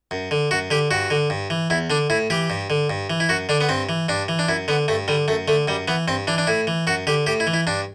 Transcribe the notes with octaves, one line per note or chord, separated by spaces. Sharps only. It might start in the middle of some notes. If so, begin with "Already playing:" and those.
F#2
D3
F#2 F#4
D3 G4
G2 F#4
D3
G2
E3
E2 E4
D3 D4
A2 E4
E3 G4
G2
D3
G2
E3
E4
F#2 F#4
D3 D4
B3
G2 C4
E3
G2 D4
E3
D4
F#2 E4
D3 B3
G2 A3
D3 G3
F#2 A3
D3 A3
F#2 G3
E3 B3
G2 C4
E3 D4
D4
A2 E4
E3
F#2 F#4
D3 G4
A2 G4
E4
E3
E4
G2 D4